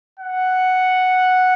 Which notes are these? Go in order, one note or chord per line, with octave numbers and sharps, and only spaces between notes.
F#5